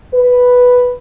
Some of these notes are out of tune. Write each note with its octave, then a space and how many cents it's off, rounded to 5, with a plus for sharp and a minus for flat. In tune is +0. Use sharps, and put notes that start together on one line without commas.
B4 +0